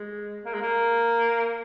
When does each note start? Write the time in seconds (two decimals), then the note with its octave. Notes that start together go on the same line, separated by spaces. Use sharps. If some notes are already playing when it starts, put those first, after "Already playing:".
Already playing: G#3
0.45 A#3
0.54 G#3
0.62 A#3